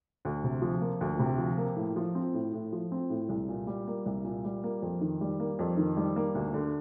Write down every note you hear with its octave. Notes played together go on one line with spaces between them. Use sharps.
D2
C3
F3
A#3
D2
C3
F3
A#3
A2
F3
C4
A2
A2
F3
C4
A2
C2
A#2
G3
A#3
C2
A#2
G3
A#3
F2
D#3
G3
A#3
F2
D#3
G3
A#3
D2
D3